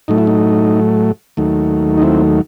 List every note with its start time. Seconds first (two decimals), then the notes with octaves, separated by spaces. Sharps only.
0.08 A2 F#3 A3 D#4
0.18 E4
0.27 D#4
1.37 D#2 D#3 F#3 A3
1.98 D#4
2.02 C4 E4